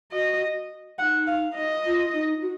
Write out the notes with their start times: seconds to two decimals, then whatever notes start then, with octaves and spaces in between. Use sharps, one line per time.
0.12 F#4 D#5
0.99 D#4 F#5
1.27 F5
1.56 D#5
1.85 F4
2.13 D#4
2.42 F#4